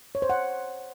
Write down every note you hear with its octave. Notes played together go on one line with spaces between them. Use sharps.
C#5
C5
F#5